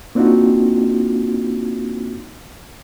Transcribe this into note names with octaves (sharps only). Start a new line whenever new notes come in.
A#3 C4 D4 D#4 F4 F#4